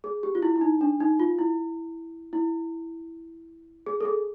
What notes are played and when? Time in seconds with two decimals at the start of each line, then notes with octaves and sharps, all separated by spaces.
0.04 G#4
0.23 G4
0.35 F4
0.42 E4
0.56 E4
0.61 D#4
0.81 D4
1.00 D#4
1.20 F4
1.39 E4
2.33 E4
3.86 G#4
4.01 A4
4.05 G#4